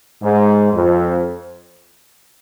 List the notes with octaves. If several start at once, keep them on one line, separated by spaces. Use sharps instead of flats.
G#2
F2